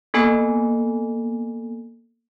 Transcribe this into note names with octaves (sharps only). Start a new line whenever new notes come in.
A#3 B3 A4 G#5 B5